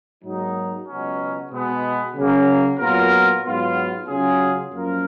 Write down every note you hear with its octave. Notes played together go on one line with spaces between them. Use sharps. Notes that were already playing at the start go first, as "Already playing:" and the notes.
G#2 F#3 A#3 D#4
C#2 B2 F#3 C#4
B2 G#3 B3
C#3 F#3 A#3
A#2 F#3 B3 F4 A#4
G#2 F#3 B3 F4
C#3 F#3 C#4 F4 G#4
F#2 F3 A#3 F4 A#4